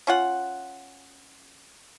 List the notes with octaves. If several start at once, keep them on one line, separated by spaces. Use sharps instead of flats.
C#4 F4 F#5